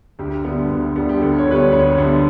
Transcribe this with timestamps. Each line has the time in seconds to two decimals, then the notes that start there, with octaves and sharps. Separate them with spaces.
0.19 D2 G4
0.45 D3 G3 B3
0.70 D2
0.96 D3 G3 B3
1.09 G4
1.21 D2 A4
1.38 C#5
1.47 D3 G3 B3 B4
1.55 C#5
1.72 D2 C#5
1.98 D3 G3 B3